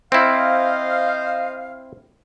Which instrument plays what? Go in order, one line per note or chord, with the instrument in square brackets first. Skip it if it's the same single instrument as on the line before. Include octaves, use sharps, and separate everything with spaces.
[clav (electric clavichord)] C4 E4 [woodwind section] C5 D#5 F5